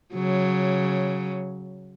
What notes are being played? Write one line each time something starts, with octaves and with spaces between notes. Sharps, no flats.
C#3 F#3